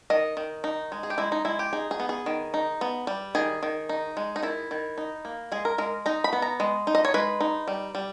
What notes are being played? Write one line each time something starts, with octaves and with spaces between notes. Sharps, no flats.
D#3 D#5
D#3
D#4
G#3
G#4
G4
G#3 E4
D#4
G#3 E4
G4
D#4 G#4
G#4
B3
G#4
D#3
D#4
B3
G3
D#3 G#4
D#3
D#4
G#3
D#4
D#3 E4
D#3
D#4
A#3
G#3 G#4
A#4
G#3 A#4
D#4 A#5
B5
B3
A#5
G#3
D#4
D#5
C#5
G#3 B4
D#4
G3
G3